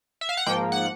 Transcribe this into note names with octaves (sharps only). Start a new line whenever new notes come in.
E5
F5
F#5
G#2 F3 A#3 G5
F#5